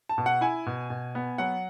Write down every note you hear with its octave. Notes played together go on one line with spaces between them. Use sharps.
A5
B2
F#5
E4 G#5
B2
B2
B3
F#3 F#5